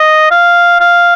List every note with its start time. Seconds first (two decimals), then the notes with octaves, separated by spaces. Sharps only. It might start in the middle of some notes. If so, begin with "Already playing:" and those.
Already playing: D#5
0.31 F5
0.80 F5